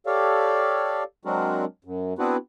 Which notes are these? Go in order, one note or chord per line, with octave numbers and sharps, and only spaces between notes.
G4 A4 C#5 D5 F5
F#3 G#3 C4 D4 F#4 A#4
F#2
B3 C4 D4 E4 F#4 B4